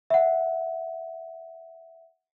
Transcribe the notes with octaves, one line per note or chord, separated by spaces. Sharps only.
E5 F#5